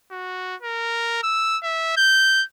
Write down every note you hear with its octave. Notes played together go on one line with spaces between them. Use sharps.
F#4
A#4
E6
E5
G6